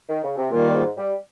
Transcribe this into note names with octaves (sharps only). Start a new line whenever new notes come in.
D#3
C#3
C3
A#2 D#3 G3 A#3 F4
A#2
G#2
G3